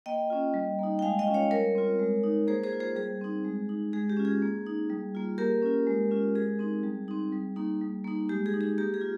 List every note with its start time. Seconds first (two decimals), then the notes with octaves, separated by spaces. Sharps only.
0.06 A#3 D#5 G5
0.30 C#4 F4
0.54 G3
0.79 A#3 D#4
0.99 G5
1.02 G#3 F5 G#5
1.19 D#5 G5
1.27 C#4 F4
1.34 C#5 F5
1.51 G3 A#4 C#5
1.75 C4 F4
1.99 G#3
2.23 D#4
2.47 A#3 G#4 C5
2.64 G#4 C5
2.73 F4
2.80 G#4 C5
2.96 G3 G#4
3.21 C4 D#4
3.44 G#3
3.69 D#4
3.93 G#3 G#4
4.10 G4
4.17 C#4 F4
4.25 G#4
4.42 A#3
4.66 D#4
4.89 G3
5.15 A#3 F4
5.38 A#3 G4 A#4
5.62 C#4 F4
5.87 G#3
6.11 C#4 F4
6.35 G#3 G#4
6.59 C4 D#4
6.83 G3
7.08 C4 D#4
7.32 G3
7.56 A#3 D#4
7.81 G3
8.05 A#3 D#4
8.29 G#3 G4
8.46 G#4
8.54 D#4
8.61 G#4
8.78 A#3 G4
8.94 G#4
9.01 F4